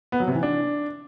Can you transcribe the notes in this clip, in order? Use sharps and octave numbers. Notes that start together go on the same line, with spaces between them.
B3
F#3
C3
E3
D4